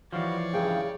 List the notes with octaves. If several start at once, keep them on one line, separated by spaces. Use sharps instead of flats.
E3 F3 G3 F#4 C#5 D5 F5
G2 C#3 E4 G#4 F5 G5